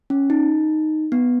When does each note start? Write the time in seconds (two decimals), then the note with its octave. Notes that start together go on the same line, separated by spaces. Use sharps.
0.10 C#4
0.30 D#4
1.12 B3